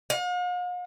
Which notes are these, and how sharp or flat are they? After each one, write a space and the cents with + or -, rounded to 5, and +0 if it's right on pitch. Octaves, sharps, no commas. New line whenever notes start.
F5 +45